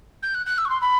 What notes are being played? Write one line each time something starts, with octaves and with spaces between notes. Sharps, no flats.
G6
F#6
F#6
E6
C#6
C6
B5